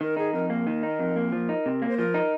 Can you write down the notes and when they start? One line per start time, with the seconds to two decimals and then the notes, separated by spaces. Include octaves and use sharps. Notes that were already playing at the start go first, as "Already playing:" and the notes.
0.01 D#3 A#4
0.17 D#4 G#4
0.33 F2 A#4
0.50 A#3 A#4
0.67 D#3
0.83 D#4
0.99 F2
1.16 A#3
1.32 F3
1.49 D#4
1.66 C3
1.82 A#3
1.88 C5
1.98 F3 A#4
2.14 D#4